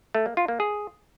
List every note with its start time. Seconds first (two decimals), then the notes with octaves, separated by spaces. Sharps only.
0.15 A3
0.26 A#3
0.37 F4
0.48 A#3
0.60 G#4